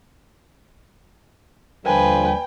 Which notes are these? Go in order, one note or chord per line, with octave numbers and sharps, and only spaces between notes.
D#2 D3 F3 G3 B4 G5 G#5